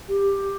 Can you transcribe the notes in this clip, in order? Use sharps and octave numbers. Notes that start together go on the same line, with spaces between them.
G4